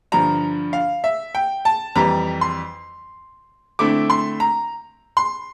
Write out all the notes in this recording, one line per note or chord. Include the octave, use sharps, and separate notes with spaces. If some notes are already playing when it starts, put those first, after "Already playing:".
G2 D3 F3 A#5
F5
E5
G5
A5
F2 E3 G3 A#5
C6
D3 A3 C4 E4 D6
C6
A#5
C6